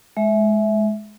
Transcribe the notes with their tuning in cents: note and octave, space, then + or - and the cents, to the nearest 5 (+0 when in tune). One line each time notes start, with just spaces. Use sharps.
G#3 +25 E5 -5